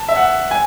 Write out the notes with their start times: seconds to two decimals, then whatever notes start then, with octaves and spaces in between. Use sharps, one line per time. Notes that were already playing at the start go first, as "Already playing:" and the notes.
Already playing: A5
0.09 E5
0.16 F#5
0.51 G#5